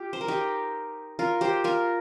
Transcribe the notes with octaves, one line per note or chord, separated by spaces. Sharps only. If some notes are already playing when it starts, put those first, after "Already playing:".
Already playing: F4 G4
C5
A#4
D#4 G4
F4 A#4
G4 C5
F4 A#4